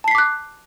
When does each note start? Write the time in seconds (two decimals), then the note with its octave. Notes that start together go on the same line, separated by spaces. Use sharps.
0.04 A5
0.08 C7
0.11 B6
0.15 D6
0.18 F#6